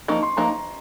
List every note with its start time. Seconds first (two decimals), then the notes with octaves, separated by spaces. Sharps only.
0.08 F3 A#3 D#4 C#6
0.23 C6
0.37 F3 A#3 D#4 A#5